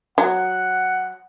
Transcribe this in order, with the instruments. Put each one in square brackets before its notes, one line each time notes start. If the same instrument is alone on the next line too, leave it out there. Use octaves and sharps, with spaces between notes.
[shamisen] F#3 [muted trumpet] F#5